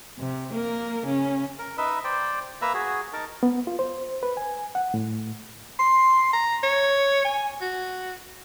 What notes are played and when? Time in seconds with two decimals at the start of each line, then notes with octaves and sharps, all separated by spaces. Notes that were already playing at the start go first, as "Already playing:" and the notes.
0.18 C3
0.54 A#3 A#4
1.05 C#3 C#4
1.59 A#4
1.78 D#4 B4 D#5 E5
2.04 C5 D5 G5
2.62 A#3 B4 E5 A#5
2.74 F#4 G#4
3.13 D#4 A#4 A5
3.43 B3
3.67 F4
3.79 C5
4.23 B4
4.37 G#5
4.75 F#5
4.94 A2
5.79 C6
6.33 A#5
6.63 C#5
7.25 G#5
7.61 F#4